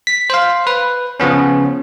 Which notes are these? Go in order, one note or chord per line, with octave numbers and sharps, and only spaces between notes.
B6
C5 F5
B4
C#3 F3 B3 C#4